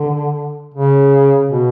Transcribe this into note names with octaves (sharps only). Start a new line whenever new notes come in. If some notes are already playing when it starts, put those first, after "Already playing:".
Already playing: D3
C#3
B2